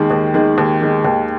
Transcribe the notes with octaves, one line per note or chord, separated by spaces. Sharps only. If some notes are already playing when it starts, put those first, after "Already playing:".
Already playing: D#2 D#3 G#3
D#2
D#3 G#3
D#2
D#3 G#3
D#2